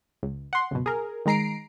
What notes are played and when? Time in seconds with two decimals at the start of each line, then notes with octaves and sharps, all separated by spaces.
0.23 C#2
0.53 F#5 C6
0.71 C#2 F#2 B2
0.86 G#4 A#4
1.26 D#3 G#3 A#5 C7 D7